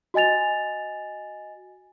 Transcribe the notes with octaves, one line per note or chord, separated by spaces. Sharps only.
F#4 D#5 G#5 A6 F7